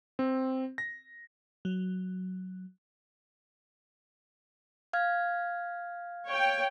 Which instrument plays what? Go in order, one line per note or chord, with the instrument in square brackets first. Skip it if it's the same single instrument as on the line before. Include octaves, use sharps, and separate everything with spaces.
[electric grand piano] C4
A#6
[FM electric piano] F#3
[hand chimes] F5 F6 G#6
[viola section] C#5 G5